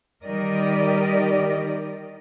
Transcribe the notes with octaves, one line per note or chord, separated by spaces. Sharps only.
D#3 G3 G4 A#4 D5 D#5